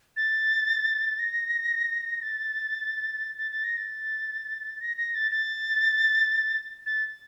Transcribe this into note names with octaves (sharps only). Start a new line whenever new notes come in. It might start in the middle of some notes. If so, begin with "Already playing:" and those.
A6
A#6
A6
A6
A6
A#6
A6
A#6
A#6
A6
A6
A6